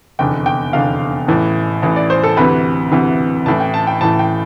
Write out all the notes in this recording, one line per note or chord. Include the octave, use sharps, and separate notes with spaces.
F1 E2 D3 G5
G5
F1 E2 D3 F5
A1 A2 E3
A1 A2 E3
D5
C5
A4
D2 C3 E3 B4
D2 C3 E3
A1 A2 E3 A5
G5
A5
G5
A1 A2 E3 A5
G5